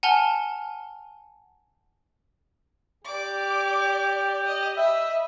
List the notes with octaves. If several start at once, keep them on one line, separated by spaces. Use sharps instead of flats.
F#5 G#5 A5 F6 F7 G7
G4 D5 D6
D#5
D#5 E5 B5